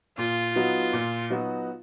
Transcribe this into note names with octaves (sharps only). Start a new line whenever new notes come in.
A#2 F4
F#3 B3 D#4 F#4
A#2
F#3 B3 D#4 F#4